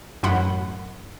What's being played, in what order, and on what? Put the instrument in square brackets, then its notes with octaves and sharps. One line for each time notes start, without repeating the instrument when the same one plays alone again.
[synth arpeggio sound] A1 F#2 F#5 B5